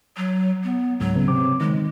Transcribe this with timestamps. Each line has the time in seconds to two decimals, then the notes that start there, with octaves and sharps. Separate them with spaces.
0.17 F#3
0.64 B3
1.00 C#2 G#2 F#3
1.15 C#3 B3
1.28 C3 C4 D6
1.61 D#3 G#3